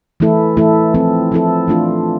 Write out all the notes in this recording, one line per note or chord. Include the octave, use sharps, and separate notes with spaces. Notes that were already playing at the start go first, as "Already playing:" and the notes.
E3 A3 E4 A4
E3 A3 E4 A4
F3 C4 E4 A4
F3 C4 E4 A4
E3 A3 D4 F4